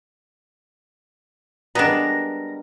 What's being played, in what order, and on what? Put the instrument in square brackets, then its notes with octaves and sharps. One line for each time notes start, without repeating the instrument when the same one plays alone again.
[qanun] G3 G#3 A#4 [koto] B3 D4 [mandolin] A#5